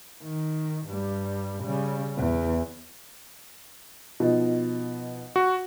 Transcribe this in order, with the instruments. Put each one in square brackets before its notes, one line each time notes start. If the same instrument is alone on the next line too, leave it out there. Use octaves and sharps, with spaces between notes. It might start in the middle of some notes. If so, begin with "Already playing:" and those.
[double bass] D#3
G2 G3
C#3 G3
E2
[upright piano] B2 F3 D#4
[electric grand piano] F#4